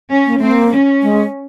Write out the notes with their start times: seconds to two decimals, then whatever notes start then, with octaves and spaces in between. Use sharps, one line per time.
0.11 C#4
0.26 A#3
0.38 A3 C4
0.51 A#3
0.72 C#4
1.02 G#3